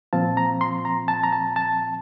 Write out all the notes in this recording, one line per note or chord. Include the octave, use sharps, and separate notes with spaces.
A#2 F3 C4 F4 A5
A#5
C6
A#5
A5
A#5
A5
A5